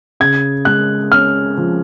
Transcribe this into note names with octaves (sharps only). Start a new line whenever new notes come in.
C#3 G#6
G#3 F#6
C#4 F6
F3